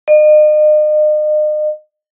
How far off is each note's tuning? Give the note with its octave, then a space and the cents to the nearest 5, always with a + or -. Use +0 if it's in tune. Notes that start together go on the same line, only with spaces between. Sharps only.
D#5 -40